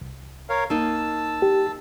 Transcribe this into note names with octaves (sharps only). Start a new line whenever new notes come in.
C2
A#4 C#5 F5
A#3 D#4 A5 E6
G4